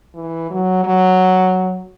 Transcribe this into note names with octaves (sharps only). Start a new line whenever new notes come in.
E3
F#3
F#3